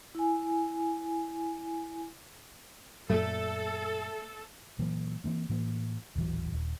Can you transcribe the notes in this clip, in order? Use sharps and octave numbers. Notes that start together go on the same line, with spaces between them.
E4 G#5
F#2 A#2 A3 A4
A#2 E3 F#3 A#3
E3 A#3 C4
A2 E3 A#3
D#1 A1 E3 F#3
D#1